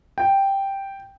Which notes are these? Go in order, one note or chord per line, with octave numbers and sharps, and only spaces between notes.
G5